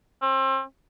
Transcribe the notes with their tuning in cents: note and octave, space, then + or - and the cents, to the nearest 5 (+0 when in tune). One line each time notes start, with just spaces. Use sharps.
C4 +35